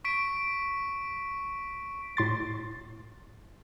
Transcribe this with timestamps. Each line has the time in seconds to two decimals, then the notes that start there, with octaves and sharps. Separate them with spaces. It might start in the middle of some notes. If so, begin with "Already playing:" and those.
0.04 C#6 B6 D7
2.17 A2 C6 A6